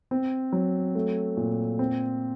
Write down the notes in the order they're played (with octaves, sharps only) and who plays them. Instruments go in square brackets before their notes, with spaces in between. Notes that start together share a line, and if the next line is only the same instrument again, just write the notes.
[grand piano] C4
F#3
A3
A#2
C4